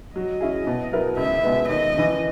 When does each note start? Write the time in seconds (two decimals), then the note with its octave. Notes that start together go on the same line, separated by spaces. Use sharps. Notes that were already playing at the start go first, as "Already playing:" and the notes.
0.16 F#3 D#5
0.41 C#4 E4 G#4
0.67 B2
0.92 F#3 B3 E4 A#4
1.17 C#2 E5
1.44 B2 G#3 B3
1.69 D#2 D#5
1.94 C#3 E3